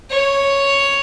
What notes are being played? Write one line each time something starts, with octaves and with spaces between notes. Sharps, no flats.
C#5